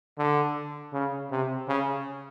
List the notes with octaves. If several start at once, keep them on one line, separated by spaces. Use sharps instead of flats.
D3
C#3
C3
C#3